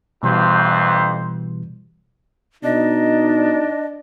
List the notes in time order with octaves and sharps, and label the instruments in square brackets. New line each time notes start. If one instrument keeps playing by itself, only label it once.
[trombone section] A1 F2 C5 [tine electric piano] B2 E3 G3
[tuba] B2 [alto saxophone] D4 [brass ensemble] D#4 [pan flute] D#5